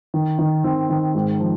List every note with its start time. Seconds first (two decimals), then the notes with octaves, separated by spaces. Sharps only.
0.14 D#3
0.39 D#3
0.64 D#3 C4
0.90 D#3
1.15 G#2
1.40 F3